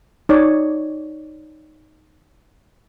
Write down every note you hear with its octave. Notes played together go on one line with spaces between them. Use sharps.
D#4 C#5 D5